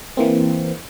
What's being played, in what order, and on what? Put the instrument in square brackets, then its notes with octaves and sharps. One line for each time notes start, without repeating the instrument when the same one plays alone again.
[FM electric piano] E3 A#3 C4